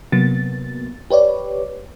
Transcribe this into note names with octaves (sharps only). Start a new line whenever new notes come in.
C3 F#3 A#3 B3 A6
G4 B4 C#5 D5